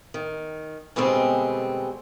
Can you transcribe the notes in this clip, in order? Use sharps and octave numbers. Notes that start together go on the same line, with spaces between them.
D#3
B2 D3 G3 G#3 C4